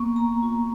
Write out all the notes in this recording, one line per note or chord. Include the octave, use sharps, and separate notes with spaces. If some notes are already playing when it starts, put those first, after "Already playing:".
Already playing: A#3 B3 C#6
A#3 A#5
F4